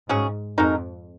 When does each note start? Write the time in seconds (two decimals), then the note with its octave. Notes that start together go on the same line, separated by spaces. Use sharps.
0.09 G#2 C#3 F#3 C#4 G#4
0.58 F2 G#3 D#4 F#4 A#4